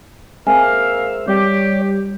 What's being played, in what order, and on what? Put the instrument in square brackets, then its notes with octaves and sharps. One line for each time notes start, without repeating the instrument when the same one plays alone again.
[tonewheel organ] G#3 C4 E5 [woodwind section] A#3 A#4 F5 [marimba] G#5
[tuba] G3 [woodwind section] G4 [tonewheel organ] C#5 D5